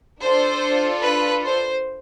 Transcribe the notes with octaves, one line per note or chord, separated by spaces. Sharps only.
D4 F4 A4 C5
B4
C5